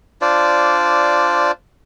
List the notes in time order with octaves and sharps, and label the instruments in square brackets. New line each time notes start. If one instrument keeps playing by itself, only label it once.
[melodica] D4 F4 C5 D5